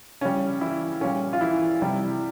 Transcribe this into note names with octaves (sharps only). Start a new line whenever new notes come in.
C#3 G3 C#4
E3 E4
A#2 G3 C#4
F4
E3 E4
C3 E3 G3